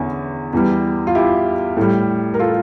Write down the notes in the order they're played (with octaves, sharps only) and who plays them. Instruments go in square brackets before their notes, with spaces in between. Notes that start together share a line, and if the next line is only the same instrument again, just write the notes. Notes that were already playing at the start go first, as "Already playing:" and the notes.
Already playing: [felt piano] E2 D3 C#4 E4
E2 E3 G3
F4
E4 G4
A2 G3
A#4
F4 A4